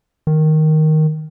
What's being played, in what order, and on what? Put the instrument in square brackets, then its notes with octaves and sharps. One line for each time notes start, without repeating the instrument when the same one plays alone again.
[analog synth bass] D#3